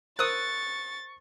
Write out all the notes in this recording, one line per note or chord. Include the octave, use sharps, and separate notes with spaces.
A#4 C5 C#6 D#6 E6 F#6 A6